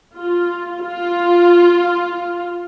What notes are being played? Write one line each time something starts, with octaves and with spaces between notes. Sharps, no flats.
F4
F4